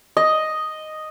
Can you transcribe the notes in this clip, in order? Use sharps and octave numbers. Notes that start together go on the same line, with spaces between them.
D#5